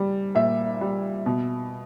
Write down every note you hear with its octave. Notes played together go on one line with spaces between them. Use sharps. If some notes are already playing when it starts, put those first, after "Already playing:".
Already playing: G3
A#2 E5
G3
B2